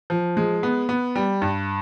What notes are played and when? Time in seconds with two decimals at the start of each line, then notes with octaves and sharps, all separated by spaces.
0.10 F3
0.37 G#3
0.63 B3
0.89 B3
1.16 G3
1.42 G2